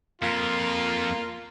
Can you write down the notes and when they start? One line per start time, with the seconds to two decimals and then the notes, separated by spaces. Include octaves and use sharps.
0.22 F2 A#3 F4